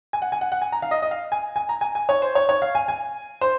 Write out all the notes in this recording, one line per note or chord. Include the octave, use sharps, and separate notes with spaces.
G#5
F#5
G#5
F#5
F#5
G#5
A#5
F5
D#5
D#5
F5
G#5
G#5
A#5
G#5
G#5
C#5
C5
C#5
C#5
F5
G#5
G#5
C5